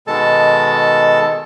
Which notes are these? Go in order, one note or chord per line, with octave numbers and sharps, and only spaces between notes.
B2 D#3 G#3 A4 A5